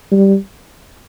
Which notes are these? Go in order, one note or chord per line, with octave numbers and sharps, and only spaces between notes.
G3